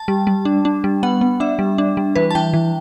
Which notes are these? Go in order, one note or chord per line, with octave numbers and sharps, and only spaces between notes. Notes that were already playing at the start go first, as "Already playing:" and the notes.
Already playing: A5
G3
G3
D4
D4
G3
B3 F#5
B3
D4 E5
G3
D4
G3
E3 B4
A5
E3 G5
E3